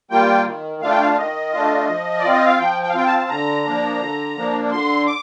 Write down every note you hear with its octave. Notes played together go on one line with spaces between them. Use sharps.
G3 A#3 F4 G5
D#3
A3 D4 F4 F5
G5
F5
F5
D#3 D#5
A3 D4 F4
F3
D5
C4 F4
D#5
F5
F3 G5
G5
F5
C4 F4 G5
A5
A5
D3 A#5
F3 A#3 D4
D3
F3 A#3 D4
D3 C6
D6